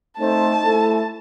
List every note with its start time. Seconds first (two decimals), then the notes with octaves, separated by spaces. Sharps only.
0.19 A3 C4 D#4 A4 C5 A5
0.64 A3 E4 A4